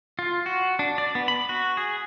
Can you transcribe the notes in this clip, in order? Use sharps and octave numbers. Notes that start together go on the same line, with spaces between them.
F4
F#4
D4
D5
B3
B5
F#4
G#4